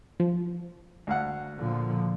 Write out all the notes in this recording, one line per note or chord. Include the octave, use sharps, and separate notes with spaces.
F3
D2 F5 F#5
A#2 D3 F3